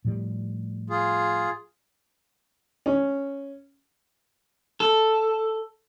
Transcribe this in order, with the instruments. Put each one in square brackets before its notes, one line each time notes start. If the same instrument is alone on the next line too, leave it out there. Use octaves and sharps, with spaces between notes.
[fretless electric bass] A2 F3 G3
[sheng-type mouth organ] F4 G#4
[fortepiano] C#4
[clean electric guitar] A4